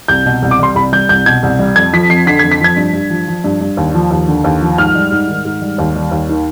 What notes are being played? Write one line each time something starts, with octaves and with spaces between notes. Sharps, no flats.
C2 G6
B2
C2
D6
G3 C6
C2 B5
G3 G6
C2 G6
B2 G#6
C2
G3
F2 G#6
F3 B6
F2 C7
D3 B6
G#6
F2
B6
F3 G#6
G2
G2
F3
F3
G2
G2
D#2
F3
D#2
D3
D#2
F3
G#2 F6
G3
G#2
D#3
G#2
G3
D#2
G3
D#2
D#3